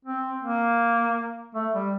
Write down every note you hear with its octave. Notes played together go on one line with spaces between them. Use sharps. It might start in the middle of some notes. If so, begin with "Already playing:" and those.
C4
A#3
A3
G3